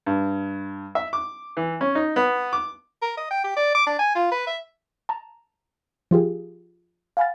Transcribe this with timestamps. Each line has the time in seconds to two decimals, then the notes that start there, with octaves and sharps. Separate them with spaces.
0.06 G2
0.95 E5
1.13 D6
1.57 E3
1.81 C#4
1.95 D#4
2.16 B3
2.53 D6
3.02 A#4
3.17 D#5
3.31 G5
3.44 G4
3.57 D5
3.75 D6
3.87 D4
3.99 G#5
4.15 F4
4.31 B4
4.47 E5
5.09 A5 A#5
6.11 F3 F4 G4 G#4
7.17 F5 F#5 G#5 B5 F6 A6